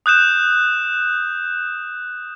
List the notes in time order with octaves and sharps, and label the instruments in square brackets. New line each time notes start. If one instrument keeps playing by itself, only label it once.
[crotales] D#6 F#6 G6 E7